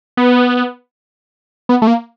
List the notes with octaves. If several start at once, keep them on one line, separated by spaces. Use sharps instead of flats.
B3
B3
A3
A#3